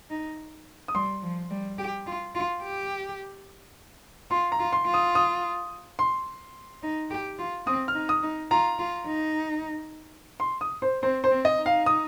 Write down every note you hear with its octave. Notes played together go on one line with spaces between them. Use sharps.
D#4
D#6
G3 C6
F3
G3
G4
F4
F4
G4
F4 C6
A#5
F4
C6
F4
D#6
D#6
C6
D#4
G4
F4
C4 D#6
F6
D#4
D#6
D#4
F4 A#5
F4
D#4
C6
D#6
C5
C4 C5
C5
C4
D#5
D#4
F5
D#6